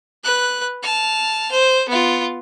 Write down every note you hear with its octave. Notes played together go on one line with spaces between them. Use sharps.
B4 F#6
A5 F6
C5
B3 F4